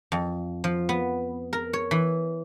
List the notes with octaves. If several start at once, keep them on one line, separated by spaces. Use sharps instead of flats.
F2
F3
B3
A#4
C#5
E3